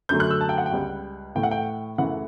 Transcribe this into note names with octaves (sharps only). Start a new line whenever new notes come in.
F#2 D3 F#3 A3 G6
F#6
E6
A5
G5
F#5
G5
C#2 C#3 G3
A2 E3 A3 G5
F#5
G5
F#2 C#3 E3 A3 F#5